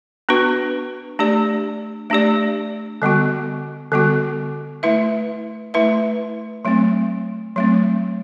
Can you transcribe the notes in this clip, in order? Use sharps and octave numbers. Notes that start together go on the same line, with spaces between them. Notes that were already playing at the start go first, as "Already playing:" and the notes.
B3 D4 F#4 B4
A3 D4 G4 D5
A3 D4 G4 D5
D3 G3 B3 F#4
D3 G3 B3 F#4
A3 E4 B4 E5
A3 E4 B4 E5
F#3 A3 C4
F#3 A3 C4